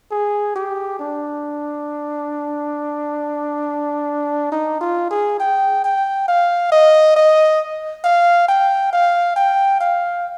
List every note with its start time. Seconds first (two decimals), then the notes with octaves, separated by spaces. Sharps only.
0.11 G#4
0.55 G4
0.99 D4
4.52 D#4
4.81 F4
5.11 G#4
5.40 G5
5.84 G5
6.28 F5
6.72 D#5
7.16 D#5
8.04 F5
8.48 G5
8.93 F5
9.36 G5
9.80 F5